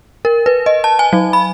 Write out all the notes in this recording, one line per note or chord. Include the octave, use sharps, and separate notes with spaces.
A#4
B4
D#5
A5
G#5
F#3
B5